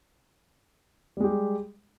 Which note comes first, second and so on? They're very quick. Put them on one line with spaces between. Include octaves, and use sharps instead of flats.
G3 G#3 G4